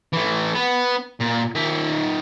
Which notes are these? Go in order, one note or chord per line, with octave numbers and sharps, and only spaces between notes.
E3 A3
B3
A#2
D#3 E5